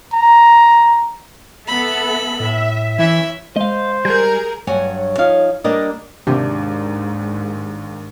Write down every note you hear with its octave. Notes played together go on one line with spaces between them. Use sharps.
A#5
B3 A4 E5 B5
A2 E5
E3 C#4 E4 E5
G#3 C5 D#5 F5
G3 G#4 A#4 G6
G2 F#3 C#5 F#5 G#5
F3 D#4 C#5 F5
G3 A#3 D4 A#4 D5 D#5
D#2 G#2 C3 D4